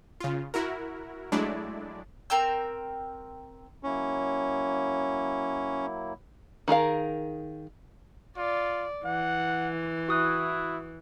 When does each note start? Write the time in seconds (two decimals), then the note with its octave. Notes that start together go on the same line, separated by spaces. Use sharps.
0.20 C#3 F4
0.54 E4 F#4 A#4
1.32 F#3 G#3 A3 D4 E4 D5
2.30 C4 A#4 G5 E6
3.83 F#3 A#3 C#4 E4
6.68 D#3 G#4 A#4 F5
8.37 F4 D5
9.05 E3 F#5
10.09 E4 F#4 D#6 F#6